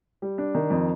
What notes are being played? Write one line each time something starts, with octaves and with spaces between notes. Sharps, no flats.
G3
D4
D#3
F2